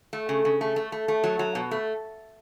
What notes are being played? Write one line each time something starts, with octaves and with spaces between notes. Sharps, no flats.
A3
C#3
C#3
A3
A3
A3
A3
F#3
F#3
B2
A3